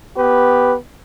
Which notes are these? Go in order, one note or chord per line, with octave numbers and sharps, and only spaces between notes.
B3 G4 B4